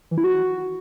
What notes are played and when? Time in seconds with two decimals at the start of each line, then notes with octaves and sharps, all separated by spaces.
0.11 E3
0.18 E4
0.24 F#4